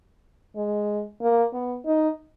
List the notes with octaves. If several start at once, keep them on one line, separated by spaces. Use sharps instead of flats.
G#3
A#3
B3
D#4